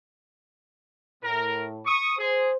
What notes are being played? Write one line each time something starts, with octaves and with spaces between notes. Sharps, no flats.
A2 A#4
C#6 D#6
G#4 C5